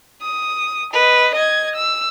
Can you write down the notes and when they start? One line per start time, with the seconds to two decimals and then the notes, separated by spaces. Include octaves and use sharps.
0.22 D#6
0.93 B4 D#5
1.36 D#5 G#6
1.76 E6